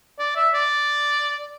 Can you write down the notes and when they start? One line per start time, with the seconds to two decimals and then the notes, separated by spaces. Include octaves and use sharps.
0.19 D5
0.36 E5
0.54 D5